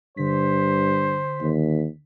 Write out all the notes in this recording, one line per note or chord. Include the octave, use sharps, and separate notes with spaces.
G2 D3 C5 B6
D#2